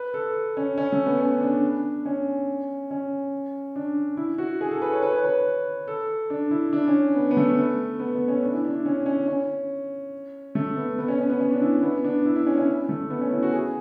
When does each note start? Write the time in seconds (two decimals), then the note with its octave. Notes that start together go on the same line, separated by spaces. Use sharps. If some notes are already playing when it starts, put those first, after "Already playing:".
Already playing: B4
0.14 A4
0.57 C#4
0.78 C#4
0.92 A3
1.06 B3
1.20 C#4
1.41 D4
2.05 C#4
2.91 C#4
3.76 D4
4.17 E4
4.38 F#4
4.61 G#4
4.71 A4
4.82 B4
4.92 C#5
5.03 B4
5.13 C#5
5.24 B4
5.88 A4
6.30 D4
6.51 E4
6.73 D4
6.87 C#4
7.15 B3
7.31 B3
7.37 A3
8.00 B3
8.15 B3
8.28 C#4
8.43 D4
8.53 E4
8.65 D4
8.86 C#4
9.06 C#4
9.27 C#4
10.55 A3
10.77 B3
10.98 B3
11.08 C#4
11.19 C#4
11.30 B3
11.40 C#4
11.51 D4
11.62 E4
11.83 B3
12.04 D4
12.25 E4
12.36 E4
12.47 C#4
12.57 C#4
12.89 A3
13.10 B3
13.21 C#4
13.32 E4
13.43 F#4
13.53 G#4